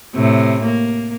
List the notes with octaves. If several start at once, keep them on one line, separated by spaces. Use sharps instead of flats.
A2 C3
A#3